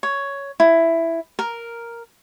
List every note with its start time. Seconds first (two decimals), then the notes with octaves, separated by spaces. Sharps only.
0.03 C#5
0.60 E4
1.39 A#4